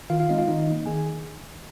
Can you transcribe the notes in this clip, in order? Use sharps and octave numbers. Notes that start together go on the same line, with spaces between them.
D#3 F4 F5
F4 F5
G#3 C4 D#4 D#5
F4 F5
D#3 D#4 D#5
A#3 D#4
D#3 G#4 G#5